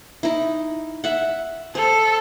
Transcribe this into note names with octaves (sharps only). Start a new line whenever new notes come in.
D#4 E4
E5 F#5
A4 C5